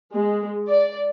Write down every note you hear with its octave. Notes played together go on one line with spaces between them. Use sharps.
G#3
D5